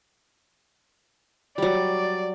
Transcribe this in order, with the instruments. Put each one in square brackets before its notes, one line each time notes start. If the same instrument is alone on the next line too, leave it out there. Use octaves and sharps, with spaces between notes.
[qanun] F#3 G3 [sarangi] D5